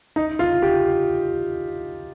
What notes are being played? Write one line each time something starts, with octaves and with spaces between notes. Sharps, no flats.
D#4
F4
G4